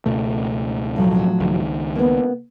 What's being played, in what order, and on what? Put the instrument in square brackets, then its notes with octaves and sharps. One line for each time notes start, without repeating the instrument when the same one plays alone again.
[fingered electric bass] C#2 B2 A3
[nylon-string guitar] A2 F3 F#3
[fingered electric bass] C#2 D#3
[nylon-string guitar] A#3 B3